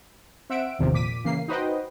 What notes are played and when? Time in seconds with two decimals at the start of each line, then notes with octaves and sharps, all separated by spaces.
0.50 C4 E5 F#5 E6 D7
0.79 G#1 E2 C3 D#3 F3
0.93 A#2 D6 B6 D#7
1.24 C#3 E3 A#3 C7
1.48 D#4 F#4 B4 C5 D#5 G5